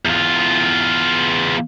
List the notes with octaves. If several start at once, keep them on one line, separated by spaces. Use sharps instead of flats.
E2 F4